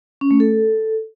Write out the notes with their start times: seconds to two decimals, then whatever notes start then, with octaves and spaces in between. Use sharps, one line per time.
0.21 C#4
0.31 A3
0.40 A4